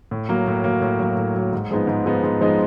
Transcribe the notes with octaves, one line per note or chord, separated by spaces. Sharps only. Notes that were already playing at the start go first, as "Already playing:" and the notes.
A2
F#3 A#3
A2
F#3 A#3
A2
F#3 A#3
A2
F#3 A#3
G#2
F3 G#3 B3 D#4
G#2
F3 G#3 B3 D#4
G#2
F3 G#3 B3 D#4